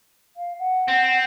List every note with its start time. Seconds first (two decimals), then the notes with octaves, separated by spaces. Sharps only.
0.36 F5
0.59 F#5
0.88 C4